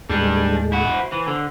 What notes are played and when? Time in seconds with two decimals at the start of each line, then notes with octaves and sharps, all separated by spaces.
0.10 D#2 A2 G3 G#3 D4
0.72 E4 F#4
0.89 C5
1.12 E3
1.27 D3